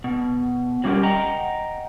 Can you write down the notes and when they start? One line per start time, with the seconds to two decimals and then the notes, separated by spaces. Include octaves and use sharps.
0.04 B2
0.84 F#3 G3 C#4 E4 G4 A#4
1.03 D#5 F#5 G5 A#5